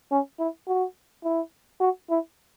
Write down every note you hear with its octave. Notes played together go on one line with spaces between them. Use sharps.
C#4
E4
F#4
E4
F#4
E4